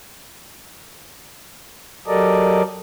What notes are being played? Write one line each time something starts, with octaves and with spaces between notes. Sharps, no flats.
F#3 G4 A4 A#4 D5 D#5